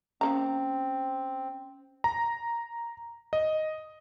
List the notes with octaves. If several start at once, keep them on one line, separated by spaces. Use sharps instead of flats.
F3 A#3 C4 C#4 A#5
A#5
D#5